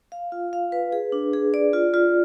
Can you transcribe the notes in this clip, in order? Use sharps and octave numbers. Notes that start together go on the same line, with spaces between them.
F5
F4
F5
B4
G#4
D4
G#4
D5
F4
F4